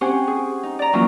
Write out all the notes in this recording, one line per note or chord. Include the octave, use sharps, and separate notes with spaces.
C4 C#4 G4 C5 F#5 G#5
G#4
D#4
D5 A#5
E3 F#3 A#3 C#4 E4 F4